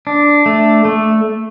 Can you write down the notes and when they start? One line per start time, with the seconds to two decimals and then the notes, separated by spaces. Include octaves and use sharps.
0.07 D4
0.46 A3
0.85 A3